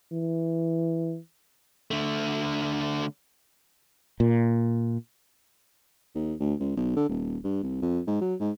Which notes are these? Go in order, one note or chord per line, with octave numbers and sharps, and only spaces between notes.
E3
D3 A3
A#2
D#2
D2
C#2
B1
D3
D#1
G2
C2
F2
G#2
F#3
G#2